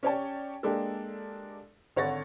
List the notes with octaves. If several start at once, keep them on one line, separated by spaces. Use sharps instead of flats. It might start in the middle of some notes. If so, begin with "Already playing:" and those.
C#4 G4 C#5 D5 G5 A5
G#3 A#3 D4 G4 A4
G#1 D3 C#5 F#5 A6 A#6